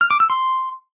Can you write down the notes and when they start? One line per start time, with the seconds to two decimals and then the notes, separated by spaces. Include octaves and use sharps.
0.01 F6
0.11 D6
0.20 E6
0.30 C6